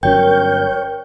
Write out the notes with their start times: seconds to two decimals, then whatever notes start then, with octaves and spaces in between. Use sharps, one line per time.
0.03 G1 F#3 C#4 A#4 C#5 G5 G6